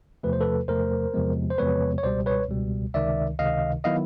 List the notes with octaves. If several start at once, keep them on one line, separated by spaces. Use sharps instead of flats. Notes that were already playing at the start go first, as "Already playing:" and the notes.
E2 C3 F3 A3 B4
C5
A4 B4
E2 C3 F3 A3 A#4 C5
E2 C3 F3 G#3 B3
C5
E2 C3 F3 G#3 B3 B4 C#5
C#5
C#2 B2 G3 C5 D5
B4 C#5
C#2 B2 G3
C#2 C3 D#3 D5 E5
C#2 C3 D#3 D#5 F5
D#3 F#3 B3 E4 D#5 F5